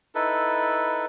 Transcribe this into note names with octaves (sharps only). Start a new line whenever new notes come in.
D#4 E4 A4 B4